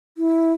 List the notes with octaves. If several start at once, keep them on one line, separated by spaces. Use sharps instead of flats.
E4